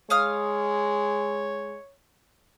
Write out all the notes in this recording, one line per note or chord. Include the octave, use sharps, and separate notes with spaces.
G#3 C#5 F5 D#6 F6